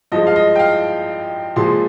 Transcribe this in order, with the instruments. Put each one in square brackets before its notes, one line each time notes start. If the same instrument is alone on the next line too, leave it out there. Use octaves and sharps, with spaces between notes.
[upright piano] G2 F3 G#3 D#5
F5
D#5
G5
F5
A#2 F3 G#3 C6